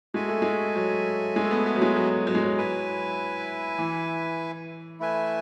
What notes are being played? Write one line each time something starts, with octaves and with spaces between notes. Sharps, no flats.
G#3 F#4 A4 E5 G#5
A3
G#3
F#3
G#3
A3
B3
B3
F#3
G#3
F#3
F#3
G#3
F#3
E4 B4 E5 G#5
E3
A3 E4 B4 E5 G#5